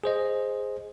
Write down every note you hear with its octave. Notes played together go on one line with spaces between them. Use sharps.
G#4 C5 D#5